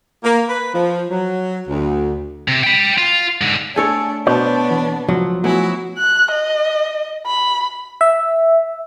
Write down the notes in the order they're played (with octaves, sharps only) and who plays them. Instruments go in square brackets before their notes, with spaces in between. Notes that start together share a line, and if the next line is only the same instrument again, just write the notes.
[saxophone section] A#3
B4
F3
F#3
D2
[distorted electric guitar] C3
G5 B5
F4
G#2 D3
[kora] A3 A4 C#5 [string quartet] D4 [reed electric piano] G#5
[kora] B2 [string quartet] B3 D4 [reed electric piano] C5 G6 [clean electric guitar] C#5
[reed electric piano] E3
[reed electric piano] C#2 [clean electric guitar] F3 [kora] F#3
[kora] F#3 [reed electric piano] A3 B3 G#5 [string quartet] E4 F#4
[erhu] F#6
D#5
B5
[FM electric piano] E5